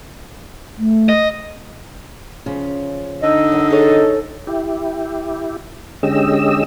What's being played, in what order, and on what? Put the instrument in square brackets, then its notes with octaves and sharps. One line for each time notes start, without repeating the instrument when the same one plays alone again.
[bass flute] A3
[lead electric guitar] D#5
[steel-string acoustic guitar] C#3 F3 C#4
[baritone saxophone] D3 [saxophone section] D#4 D#5 [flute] E6
[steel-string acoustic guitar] F#2
[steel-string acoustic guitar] G#4 C#5 [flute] A4
[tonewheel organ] E4 G4
D3 G#3 C#4 G4 D#5 E6